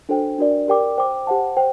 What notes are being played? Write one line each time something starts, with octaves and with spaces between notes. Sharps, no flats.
D4 F#4 A4 C5 G5
D4 F#4 A#4 D5
G4 A#4 D5 G5 D6
C5 G5 D6
G4 C5 F#5 A5
C5 G5